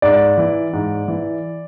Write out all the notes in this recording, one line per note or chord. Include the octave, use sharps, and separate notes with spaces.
G#2 D5
E3
G#2
E3